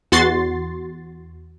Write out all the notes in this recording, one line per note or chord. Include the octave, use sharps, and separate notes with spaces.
E2 F#4 C6 A6 C7